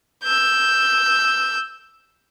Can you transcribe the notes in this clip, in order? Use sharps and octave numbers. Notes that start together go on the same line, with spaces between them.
E6 G6